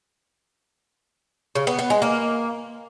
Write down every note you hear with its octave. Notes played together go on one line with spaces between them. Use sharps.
C#3
B3
B3
G#3
A#3